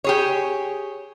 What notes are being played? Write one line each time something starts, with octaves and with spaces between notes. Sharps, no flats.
G4 G#4 C#5